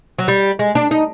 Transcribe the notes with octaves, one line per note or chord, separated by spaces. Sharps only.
F#3
G3
G#3
D4
D#4